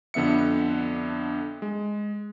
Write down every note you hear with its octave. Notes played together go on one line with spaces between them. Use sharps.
F2 D3 B3 E5 C#7
G#3